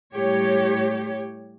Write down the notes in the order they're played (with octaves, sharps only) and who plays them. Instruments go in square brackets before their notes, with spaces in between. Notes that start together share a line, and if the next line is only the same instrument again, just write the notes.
[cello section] A2 G3 G4 C#5